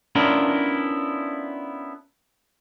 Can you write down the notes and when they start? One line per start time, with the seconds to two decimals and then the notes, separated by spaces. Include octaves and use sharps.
0.15 B3 C#4 D4 E4 F4 A#4